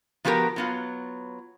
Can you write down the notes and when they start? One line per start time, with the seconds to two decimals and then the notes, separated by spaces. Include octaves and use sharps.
0.25 F3 B3 F#4 G4 A#4
0.56 F#3 B3 F4